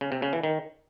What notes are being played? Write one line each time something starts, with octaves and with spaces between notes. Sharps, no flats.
C#3
C3
C#3
E3
D#3